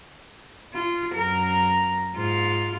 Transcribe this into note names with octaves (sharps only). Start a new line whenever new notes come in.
F4
F#2 A#4
G#2 F4